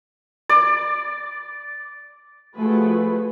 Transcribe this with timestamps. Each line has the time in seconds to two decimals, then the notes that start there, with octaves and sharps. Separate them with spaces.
0.49 D5
2.55 F3 A3 F#4 G#4 B4